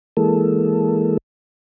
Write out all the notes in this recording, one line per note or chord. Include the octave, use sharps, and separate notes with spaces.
E3 G#3 A#3 A4